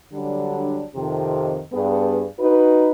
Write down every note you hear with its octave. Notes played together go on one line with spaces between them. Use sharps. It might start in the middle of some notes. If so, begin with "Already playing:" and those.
D3 F#3 G3 D4
F2 C3 D#3
G2 B3 G#4
D#4 F#4 B4